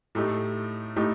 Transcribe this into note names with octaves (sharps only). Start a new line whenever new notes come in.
A2 A3 D#4 G4
A2 A3 D#4 G4